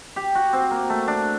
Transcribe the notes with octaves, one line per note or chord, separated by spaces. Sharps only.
G4
F#4
C4
A#3
A3
D4